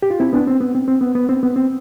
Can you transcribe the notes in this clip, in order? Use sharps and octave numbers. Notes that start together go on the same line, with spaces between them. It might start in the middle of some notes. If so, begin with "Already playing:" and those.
G4
F4
C4 E4
B3 D4
C4
B3
C4
C4
B3
B3
C4
B3
C4